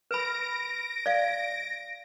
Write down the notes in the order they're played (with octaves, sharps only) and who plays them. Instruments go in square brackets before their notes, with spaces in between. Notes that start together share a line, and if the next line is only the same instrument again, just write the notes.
[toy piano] B4 B5 [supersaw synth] A#6 D7
[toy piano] D5 F5